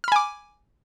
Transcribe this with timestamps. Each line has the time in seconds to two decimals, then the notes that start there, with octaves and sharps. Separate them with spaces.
0.04 F6
0.08 B5
0.12 G#5
0.16 D6